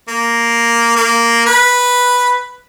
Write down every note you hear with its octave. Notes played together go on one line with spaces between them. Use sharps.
A#3
A#3
B4